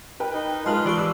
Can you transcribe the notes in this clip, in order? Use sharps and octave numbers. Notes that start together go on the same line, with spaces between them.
A#4 B4 G5
D#4
G#3 F4 B4 A5 F#7
E3 G4 D5 C#6
E3 D6 E6